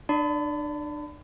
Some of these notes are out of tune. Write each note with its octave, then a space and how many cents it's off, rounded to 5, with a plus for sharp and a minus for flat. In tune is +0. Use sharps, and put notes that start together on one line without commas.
D4 +30 D5 -20 B5 +35